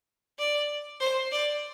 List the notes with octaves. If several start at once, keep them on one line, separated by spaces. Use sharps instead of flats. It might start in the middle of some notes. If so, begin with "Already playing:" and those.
D5
C5
D5